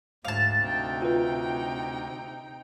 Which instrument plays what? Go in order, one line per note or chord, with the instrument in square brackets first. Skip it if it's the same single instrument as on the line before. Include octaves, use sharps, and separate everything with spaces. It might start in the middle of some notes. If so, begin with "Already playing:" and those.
[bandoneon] D2 [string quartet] G#2 [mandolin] F5 A5
[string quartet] C3 D#4 G5
[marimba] F4 B4